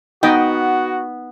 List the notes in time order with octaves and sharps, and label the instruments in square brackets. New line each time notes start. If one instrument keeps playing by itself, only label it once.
[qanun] B3 [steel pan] D#4 D#5 G5 [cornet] F#4